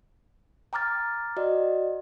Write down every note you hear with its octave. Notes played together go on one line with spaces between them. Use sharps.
G5 A#5 D6 F6 A6
F#4 D5 D#5